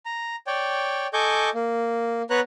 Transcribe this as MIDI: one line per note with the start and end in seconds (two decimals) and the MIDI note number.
0.05 0.36 82
0.47 1.07 73
0.47 1.07 74
0.47 1.07 79
1.13 1.50 69
1.13 1.50 75
1.13 1.50 80
1.13 1.50 85
1.13 1.50 86
1.13 1.50 91
1.54 2.22 58
2.30 2.40 59
2.30 2.40 71
2.30 2.40 73
2.30 2.40 82
2.30 2.40 90